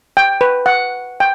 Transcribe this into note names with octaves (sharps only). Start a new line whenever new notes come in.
G5
B4
F#5
G5